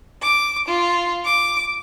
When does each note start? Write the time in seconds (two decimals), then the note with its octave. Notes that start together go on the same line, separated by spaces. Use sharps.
0.21 D6
0.66 F4
1.25 D6